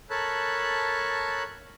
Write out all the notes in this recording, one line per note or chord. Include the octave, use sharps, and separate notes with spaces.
A4 A#4 C#5 A5 B5 F#6